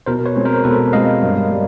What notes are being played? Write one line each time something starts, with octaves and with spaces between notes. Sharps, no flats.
B2 A#4 C5
B4 C#5
G#3 C4
A#4 C5
B2 A4 B4
G#3 C4 D#5 F5
G2
G3